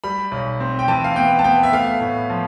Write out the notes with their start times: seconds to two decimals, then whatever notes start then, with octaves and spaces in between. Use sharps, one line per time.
0.04 G3 B5
0.31 B1
0.60 C4
0.79 G5
0.88 E3 A5
1.04 F5
1.16 B3 G5
1.39 A5
1.44 B3 G5
1.63 E5
1.73 A3 F5
2.01 A2
2.30 F3